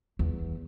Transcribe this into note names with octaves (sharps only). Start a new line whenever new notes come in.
E2